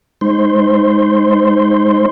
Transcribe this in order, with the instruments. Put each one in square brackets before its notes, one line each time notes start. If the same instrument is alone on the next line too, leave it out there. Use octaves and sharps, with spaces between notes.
[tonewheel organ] G#3 D#4 C5 C6